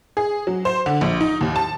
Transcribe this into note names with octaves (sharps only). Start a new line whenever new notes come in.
G#4
F#3
C5
D3
A#1
D#4
D#2
A5